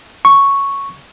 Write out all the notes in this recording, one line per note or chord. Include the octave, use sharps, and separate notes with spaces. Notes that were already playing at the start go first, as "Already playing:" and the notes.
C#6